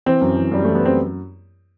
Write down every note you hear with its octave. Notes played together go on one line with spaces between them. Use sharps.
E3 C4
F#2
E3
F#2 G3
E3 A3
B3
F#2 C4